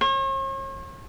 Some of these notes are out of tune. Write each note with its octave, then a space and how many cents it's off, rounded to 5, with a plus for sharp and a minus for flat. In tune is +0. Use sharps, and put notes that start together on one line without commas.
C#5 -45